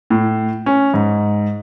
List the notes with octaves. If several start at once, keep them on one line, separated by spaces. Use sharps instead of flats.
A2
C#4
G#2